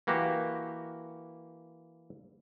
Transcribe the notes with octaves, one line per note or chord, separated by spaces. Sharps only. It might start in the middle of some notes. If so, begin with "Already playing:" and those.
E3 A#3 F#4 G4